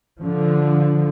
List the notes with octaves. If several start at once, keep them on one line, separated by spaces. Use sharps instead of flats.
D3 F3